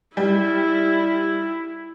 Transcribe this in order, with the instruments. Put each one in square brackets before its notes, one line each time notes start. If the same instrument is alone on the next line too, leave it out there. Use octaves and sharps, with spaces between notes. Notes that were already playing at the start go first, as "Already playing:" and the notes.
[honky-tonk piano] G3 [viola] E4